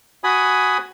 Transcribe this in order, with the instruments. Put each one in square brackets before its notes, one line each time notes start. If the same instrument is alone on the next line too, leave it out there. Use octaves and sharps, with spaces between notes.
[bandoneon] F#4 G#5 B5 D#6